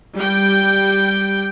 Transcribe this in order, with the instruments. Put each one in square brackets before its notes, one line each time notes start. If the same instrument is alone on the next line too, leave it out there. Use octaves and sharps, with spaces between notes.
[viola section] G3 G5